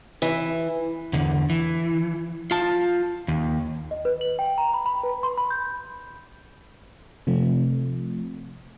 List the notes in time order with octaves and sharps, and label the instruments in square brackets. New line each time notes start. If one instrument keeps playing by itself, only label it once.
[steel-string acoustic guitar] E3
[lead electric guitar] E2 D3
E3
F4 A5
D#2
[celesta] D#5
B4
F#7
G5
A#5
B5
B5
B4
C6
B5
G6
[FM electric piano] C3 F3 A3